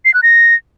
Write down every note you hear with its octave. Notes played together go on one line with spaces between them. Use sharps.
C7
F#6
A#6